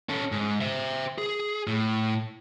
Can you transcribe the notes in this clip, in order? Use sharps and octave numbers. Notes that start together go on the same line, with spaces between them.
C#4 A4
G#2
C5 E5
G#4
A2